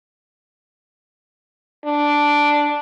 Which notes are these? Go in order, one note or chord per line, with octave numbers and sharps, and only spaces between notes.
D4